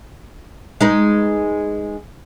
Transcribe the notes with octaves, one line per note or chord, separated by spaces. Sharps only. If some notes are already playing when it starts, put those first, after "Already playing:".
G#3 D#4 B4